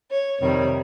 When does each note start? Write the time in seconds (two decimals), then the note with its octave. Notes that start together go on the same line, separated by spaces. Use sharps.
0.11 C#5
0.40 F2 C3 D#3 G3 C#5